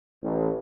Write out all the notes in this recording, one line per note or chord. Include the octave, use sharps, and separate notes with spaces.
A1